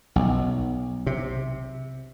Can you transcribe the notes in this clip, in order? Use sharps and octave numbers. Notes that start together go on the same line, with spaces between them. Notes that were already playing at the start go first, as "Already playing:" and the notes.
B1
C3